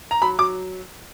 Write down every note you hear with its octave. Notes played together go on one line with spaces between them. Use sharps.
A#5
F#3 B5
F#3 D6